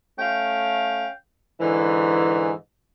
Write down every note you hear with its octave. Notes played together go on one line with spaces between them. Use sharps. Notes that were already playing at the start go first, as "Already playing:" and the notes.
A3 C#4 F5 G5
G#2 D3 E3